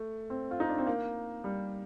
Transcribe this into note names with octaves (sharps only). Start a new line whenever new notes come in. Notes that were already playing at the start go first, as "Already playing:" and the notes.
Already playing: A3
C4
F4
D#4
D4
C4
A#3
G3